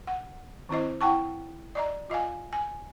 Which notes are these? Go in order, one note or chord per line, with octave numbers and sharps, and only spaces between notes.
F#5
D#3 C4 E4 C5 D#5
E4 F#5 G5 A5 C#6
D5 D#5 A#5
F4 D#5 F5 G#5
G#5